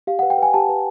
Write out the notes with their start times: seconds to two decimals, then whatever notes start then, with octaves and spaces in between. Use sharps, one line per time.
0.07 G4 F5
0.19 F#5
0.23 B4
0.30 G5
0.38 B4 G#5
0.54 G4 A5
0.69 B4